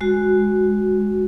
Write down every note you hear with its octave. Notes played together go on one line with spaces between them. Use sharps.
G#3 F#4